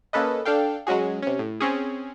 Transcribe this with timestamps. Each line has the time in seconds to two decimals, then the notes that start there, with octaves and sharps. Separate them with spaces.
0.13 A#3 C#4 A4 B4 D#5
0.45 D4 A4 F5 G5
0.87 F#3 G#3 C#4 F#4 G#4
1.22 C3 C#4
1.39 A2
1.60 C4 C#4 G#4